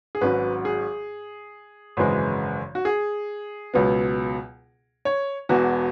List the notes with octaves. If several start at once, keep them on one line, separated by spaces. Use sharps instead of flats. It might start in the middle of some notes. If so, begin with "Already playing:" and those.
G#4
G#1 G#2 F#3 C#4 B4
G#4
G#1 F#2 C#3 E3 G#3
F#4
G#4
C#2 B2 F#3 B3
C#5
E1 E2 E3 B3 F#4